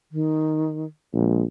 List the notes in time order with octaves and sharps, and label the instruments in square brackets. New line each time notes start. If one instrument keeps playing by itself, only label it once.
[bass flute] D#3
[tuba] A#1 [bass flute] G#3